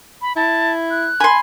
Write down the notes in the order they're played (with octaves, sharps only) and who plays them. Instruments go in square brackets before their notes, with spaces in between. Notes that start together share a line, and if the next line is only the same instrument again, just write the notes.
[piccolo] B5
[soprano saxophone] E4 [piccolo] A5
[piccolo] F#6
[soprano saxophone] G#5 [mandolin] B5 C6